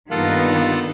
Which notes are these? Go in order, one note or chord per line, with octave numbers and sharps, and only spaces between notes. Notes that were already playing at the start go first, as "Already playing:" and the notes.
G2 D#3 G3 A#3 B3 F4 A4 F#5